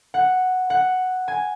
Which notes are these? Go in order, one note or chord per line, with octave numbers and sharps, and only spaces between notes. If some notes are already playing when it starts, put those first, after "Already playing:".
F#5
F#5
G#5